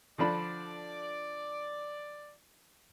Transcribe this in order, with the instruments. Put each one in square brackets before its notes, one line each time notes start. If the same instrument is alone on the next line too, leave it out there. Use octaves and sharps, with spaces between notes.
[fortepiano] D3 F3 D4 [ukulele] F4 B5 [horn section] D5